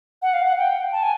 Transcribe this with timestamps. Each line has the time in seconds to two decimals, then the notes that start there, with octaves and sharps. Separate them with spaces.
0.22 F#5
0.34 F5
0.45 F#5
0.58 G5
0.92 A5
1.03 G#5